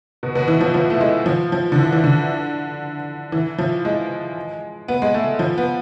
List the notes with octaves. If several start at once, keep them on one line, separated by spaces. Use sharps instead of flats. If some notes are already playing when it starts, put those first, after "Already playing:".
B2
B2
E3
F3
F3
A3
G#3
F3
F3
D3
E3
E3
D3
E3
F3
G#3
B3
G#3
A3
F3
B3